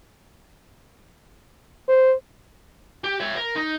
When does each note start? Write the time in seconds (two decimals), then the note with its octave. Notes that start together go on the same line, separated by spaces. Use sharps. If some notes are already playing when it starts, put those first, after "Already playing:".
1.89 C5
3.04 G4
3.20 C#5 E5
3.36 A#4
3.55 D#4